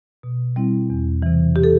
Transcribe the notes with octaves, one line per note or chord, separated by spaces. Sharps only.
B2
G3 C4 E4
E2
C3 E3
G4
A4